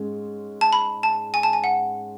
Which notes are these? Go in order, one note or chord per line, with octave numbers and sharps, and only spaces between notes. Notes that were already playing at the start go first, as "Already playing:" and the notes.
Already playing: G#2 G#3 C#4
A5
B5
A5
G#5
A5
G#5
F#5